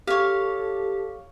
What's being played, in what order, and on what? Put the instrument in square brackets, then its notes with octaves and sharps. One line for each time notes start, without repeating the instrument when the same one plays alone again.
[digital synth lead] G4 [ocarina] A4 [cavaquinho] C#5 F5